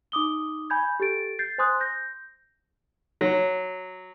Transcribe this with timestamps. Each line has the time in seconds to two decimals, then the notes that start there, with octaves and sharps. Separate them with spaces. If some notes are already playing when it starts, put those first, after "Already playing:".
0.12 D#4 D6 D#6 G7
0.70 G#5 B5 G6 G#6
1.00 G4 A4 A6 D7
1.39 G6 A6 C7
1.58 C5 G#5 C6 D#6 F#6
1.80 G6 A#6
3.21 F#3